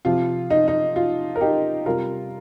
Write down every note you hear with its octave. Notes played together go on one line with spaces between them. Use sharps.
C3 F3 F4
D#4
D#4
F4
A#4
D#4 G4
C3 G3 F4 A#4